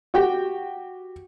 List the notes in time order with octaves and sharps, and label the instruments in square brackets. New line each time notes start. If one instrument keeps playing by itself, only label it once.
[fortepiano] F#4 G4 G5